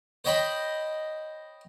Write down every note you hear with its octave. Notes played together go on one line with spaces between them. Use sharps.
C5 C#5 D#5 G5 B5